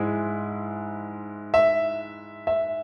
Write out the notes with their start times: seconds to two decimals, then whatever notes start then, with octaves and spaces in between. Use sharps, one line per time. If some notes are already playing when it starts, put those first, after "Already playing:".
Already playing: G#2 G#3 E4
1.54 E5
2.47 E5